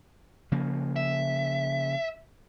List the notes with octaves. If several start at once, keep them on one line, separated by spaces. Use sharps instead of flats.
C#3 F3 A#3
E5